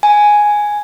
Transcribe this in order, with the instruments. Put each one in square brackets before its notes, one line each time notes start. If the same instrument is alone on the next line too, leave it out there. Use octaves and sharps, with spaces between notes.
[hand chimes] G#5